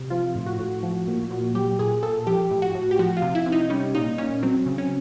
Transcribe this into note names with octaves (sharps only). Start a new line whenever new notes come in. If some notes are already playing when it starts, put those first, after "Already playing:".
Already playing: C3
F3 F4
A2
F#4
A2
F3
A#2
A#2
F#3 G4
A#2 G#4
A#2 A4
F3 G4
A2
F#4
A2
G4
F3 F#4
F4
C3
E4
C3
D#4
G3 C#4
A#2 D#4
A#2 C#4
F#3 C4
C#3
C#4